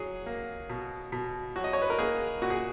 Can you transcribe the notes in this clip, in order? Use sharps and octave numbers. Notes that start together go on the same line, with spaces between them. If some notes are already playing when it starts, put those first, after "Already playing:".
Already playing: F#3 G#4
A#3
B2
B2
F#3 F#4
D#5
C#5
B4
A#4
A#3 G#4
A#2 F#4
G#4